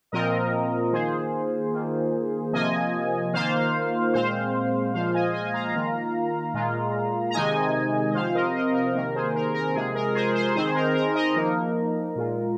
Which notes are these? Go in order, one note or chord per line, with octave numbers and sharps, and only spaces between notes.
A#2 F3 C4 F4 A#4 D#5
D#3 A#3 F4 G#4 C5
D#3 A#3 F4
C3 F3 A#3 F4 D#5 G#5
D#3 A#3 F4 C5 F5
A#2 G#3 C4 C5 F5
A#2 F3 G#3 F4 C5 F5
D#5 G#5
D#5 G#5
F5 A#5
D#3 A#3 F4
A#2 G#3 F4
A#5
C3 D#3 G#3 D#4 D#5 G#5
D#5
C3 F3 C4 F4 C5 F5
A#4 D#5
A#4 D#5
A#4
C3 D#3 A#3 A#4
G#4 C5
A#4
A#4
C3 F3 G#3 G#4
A#4
G#4 C5
G#4 C5
D#3 C4 D#4 G#4 C5
A#4
A#4
A#4 D#5
F3 A#3 D#4 A#4
A#2 G#3 F4